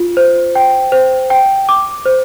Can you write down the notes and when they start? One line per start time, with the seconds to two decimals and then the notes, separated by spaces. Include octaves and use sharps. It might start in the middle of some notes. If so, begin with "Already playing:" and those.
Already playing: F4
0.17 C5
0.55 G5
0.92 C5
1.30 G5
1.69 D6
2.06 C5